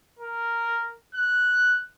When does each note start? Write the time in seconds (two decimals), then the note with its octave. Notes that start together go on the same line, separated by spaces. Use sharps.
0.19 A#4
1.15 F#6